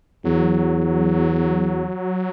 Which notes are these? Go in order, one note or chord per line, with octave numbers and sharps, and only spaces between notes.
E2 F#3